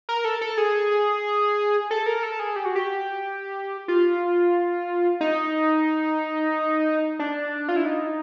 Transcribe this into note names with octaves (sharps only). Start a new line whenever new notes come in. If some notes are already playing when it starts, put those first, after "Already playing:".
A#4
A4
A4
G#4
A4
A#4
A4
G#4
G4
F#4
G4
F4
D#4
D4
F4
E4
D#4